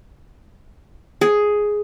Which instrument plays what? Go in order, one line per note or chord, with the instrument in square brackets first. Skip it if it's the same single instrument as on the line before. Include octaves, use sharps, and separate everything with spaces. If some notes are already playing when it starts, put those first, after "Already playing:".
[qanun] G#4